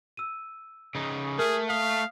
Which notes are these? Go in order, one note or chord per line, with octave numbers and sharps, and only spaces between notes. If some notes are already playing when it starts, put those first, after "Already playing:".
E6 D#7
C#3 D#4
A3 G#4 A#4 F6
F5 D#6 B6